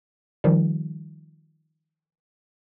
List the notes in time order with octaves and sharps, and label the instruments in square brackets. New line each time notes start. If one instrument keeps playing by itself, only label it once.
[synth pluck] D#3 F3 G3